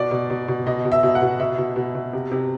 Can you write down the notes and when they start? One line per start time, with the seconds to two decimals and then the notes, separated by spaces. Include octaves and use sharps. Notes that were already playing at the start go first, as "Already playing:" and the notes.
Already playing: B2 D5
0.11 B2
0.30 B2
0.48 B2
0.66 B2 D#5
0.85 B2
0.92 E5
1.03 B2
1.15 F#5
1.22 B2
1.40 B2 E5
1.58 B2
1.76 B2
1.95 B2
2.13 C3
2.31 C3